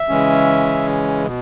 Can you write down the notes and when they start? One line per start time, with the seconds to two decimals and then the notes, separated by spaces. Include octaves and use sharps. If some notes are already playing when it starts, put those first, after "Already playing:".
Already playing: E5
0.09 C#3 E3 G#3 C#4
1.27 B2